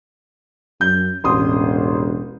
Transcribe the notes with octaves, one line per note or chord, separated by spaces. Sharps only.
F#2 G6
E1 A1 C6 D#6